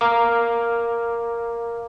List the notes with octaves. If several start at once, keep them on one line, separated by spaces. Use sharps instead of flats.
A#4 F5 D6